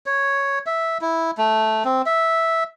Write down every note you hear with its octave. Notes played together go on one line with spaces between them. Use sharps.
C#5
E5
E4
A3
C4
E5